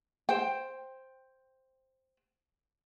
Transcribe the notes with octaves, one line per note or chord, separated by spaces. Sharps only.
C5 G5